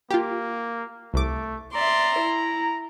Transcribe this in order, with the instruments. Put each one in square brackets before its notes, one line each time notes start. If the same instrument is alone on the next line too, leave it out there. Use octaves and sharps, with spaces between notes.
[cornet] A#3 [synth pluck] F4 G4
[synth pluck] C2 D6 [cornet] A3
[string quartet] D5 E5 C6 [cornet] A#5
[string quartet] E4